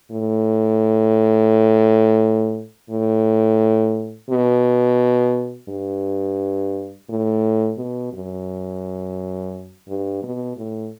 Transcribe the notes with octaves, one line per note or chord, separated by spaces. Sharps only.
A2
A2
B2
G2
A2
B2
F#2
G2
B2
A2